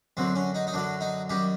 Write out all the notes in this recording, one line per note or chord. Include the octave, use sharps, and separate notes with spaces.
F#2 D3 F#3 C4
C#4
D#4
D#4
F#2 D3 F#3 D4
D#4
F#2 D#3 G3 G4